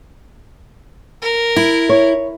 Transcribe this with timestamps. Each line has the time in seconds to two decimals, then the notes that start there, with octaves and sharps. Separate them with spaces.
1.22 A#4
1.56 E4
1.89 C#5